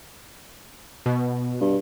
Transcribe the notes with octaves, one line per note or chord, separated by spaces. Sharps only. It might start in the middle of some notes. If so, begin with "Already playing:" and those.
B2
G2